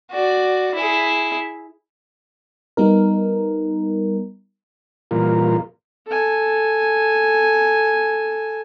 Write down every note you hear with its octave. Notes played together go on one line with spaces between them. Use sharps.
F#4 D5
E4 G#4
G3 B3 D#4 A#4
A#2 E3 G3 F4 A#4
A4 G#5